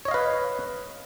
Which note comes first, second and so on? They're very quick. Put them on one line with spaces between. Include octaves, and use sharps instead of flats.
C#5 D#5 F5 B4